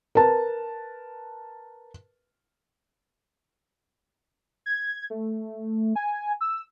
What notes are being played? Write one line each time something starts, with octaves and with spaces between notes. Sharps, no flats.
A#4 B4 A5
G#6
A3
G#5
E6